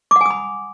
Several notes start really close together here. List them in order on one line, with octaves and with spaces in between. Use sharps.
D6 F#5 G#5 D#6 B5